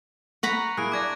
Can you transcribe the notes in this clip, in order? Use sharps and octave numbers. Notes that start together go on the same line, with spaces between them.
F#5 A#5 B5 C#6
A#3 E4 G#4 F#6 D7
B3 D4 B4 D6 G#6 A#6